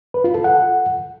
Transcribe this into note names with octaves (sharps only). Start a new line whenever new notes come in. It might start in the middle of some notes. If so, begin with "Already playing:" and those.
B4
F4
A4
F#5